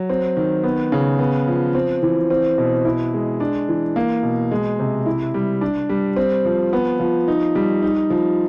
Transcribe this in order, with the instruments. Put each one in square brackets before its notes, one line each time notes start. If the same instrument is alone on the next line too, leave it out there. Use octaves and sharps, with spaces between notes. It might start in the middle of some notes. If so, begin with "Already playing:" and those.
Already playing: [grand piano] F#3
C4
D#3
B3
C#3
B3
F3
C4
E3
C4
B2
E4
G#3
D4
E3
A#3
B2
G#3
C3
E4
G3
D4
G3
C4
F3
B3
F3
D#4
G3
D#4
F3